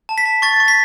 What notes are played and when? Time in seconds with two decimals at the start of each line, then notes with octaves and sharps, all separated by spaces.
0.09 A5
0.18 B6
0.25 A5
0.42 C#6 A6
0.60 C#6
0.68 B6